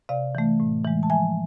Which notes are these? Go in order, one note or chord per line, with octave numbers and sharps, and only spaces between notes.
C3 D5 F5
E3 A3
A2
E3 G#3
A5
F3 E5 G#5